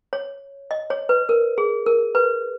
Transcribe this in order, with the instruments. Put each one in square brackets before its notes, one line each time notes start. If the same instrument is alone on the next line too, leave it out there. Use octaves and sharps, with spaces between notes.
[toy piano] C#5
D#5
C#5
B4
A#4
G#4
A#4
B4